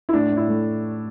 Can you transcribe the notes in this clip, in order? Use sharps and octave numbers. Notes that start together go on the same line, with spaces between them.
E4
A2 D4
A2
E4
A3